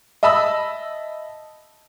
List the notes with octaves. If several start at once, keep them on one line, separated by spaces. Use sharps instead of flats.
D#5 E5 A5 B5 D#6 E6